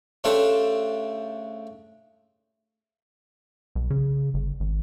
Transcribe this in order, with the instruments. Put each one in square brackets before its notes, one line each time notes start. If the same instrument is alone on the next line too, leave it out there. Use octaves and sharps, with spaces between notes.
[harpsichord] C#3 A3 D4 G4 A4 C5
[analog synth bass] B1
C#3
G1
G#1